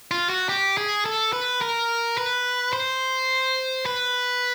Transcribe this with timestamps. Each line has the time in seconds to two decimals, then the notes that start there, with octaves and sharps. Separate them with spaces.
0.11 F4
0.30 F#4
0.49 G4
0.77 G#4
1.06 A4
1.33 B4
1.61 A#4
2.18 B4
2.73 C5
3.86 B4